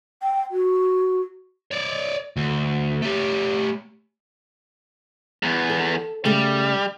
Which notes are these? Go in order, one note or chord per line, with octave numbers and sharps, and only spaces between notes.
G5
F#4
C#5 D5
D2
A3 G4
E2 B3
A4
C#3 G3 A3